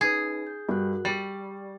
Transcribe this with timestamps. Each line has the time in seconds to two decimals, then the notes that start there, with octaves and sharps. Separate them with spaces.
0.01 C#4 D#4 G#4 B4
0.47 G6
0.69 G2 F#4 A#4 F#6
1.05 G3 D5 C#6 A6